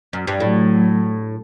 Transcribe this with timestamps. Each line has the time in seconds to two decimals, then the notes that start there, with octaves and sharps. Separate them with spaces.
0.13 F#2
0.27 G2
0.40 A2 F#3 A3